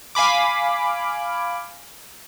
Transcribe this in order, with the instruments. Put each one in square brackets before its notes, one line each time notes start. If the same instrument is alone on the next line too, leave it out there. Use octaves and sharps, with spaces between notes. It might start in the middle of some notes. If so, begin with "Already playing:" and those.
[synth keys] F5 G#5 B5 D6